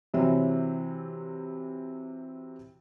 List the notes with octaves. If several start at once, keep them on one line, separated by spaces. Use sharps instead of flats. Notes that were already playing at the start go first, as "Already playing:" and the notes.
C3 E3 F#3 C4